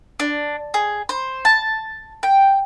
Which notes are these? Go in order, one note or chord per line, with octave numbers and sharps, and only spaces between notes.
D4
G#4
C5
A5
G5